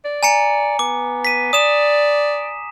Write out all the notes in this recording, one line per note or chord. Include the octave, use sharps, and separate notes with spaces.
D5
G#5 A#5 C#7
B3 D6
B6 D#7
D5 D#6 E7